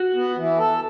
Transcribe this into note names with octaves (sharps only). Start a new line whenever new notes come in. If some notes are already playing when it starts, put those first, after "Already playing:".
Already playing: F#4
B3
E3
A4